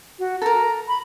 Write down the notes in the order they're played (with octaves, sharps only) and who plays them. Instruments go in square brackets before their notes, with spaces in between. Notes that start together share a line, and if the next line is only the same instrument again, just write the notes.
[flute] F#4
[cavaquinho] A4 A#4 [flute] A#5
[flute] B5